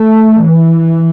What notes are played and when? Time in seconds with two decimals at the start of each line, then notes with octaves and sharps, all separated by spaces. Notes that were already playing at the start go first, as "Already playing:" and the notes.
Already playing: A3
0.43 E3